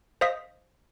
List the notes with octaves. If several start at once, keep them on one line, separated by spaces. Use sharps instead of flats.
C5 D#5 F5 D#6 B6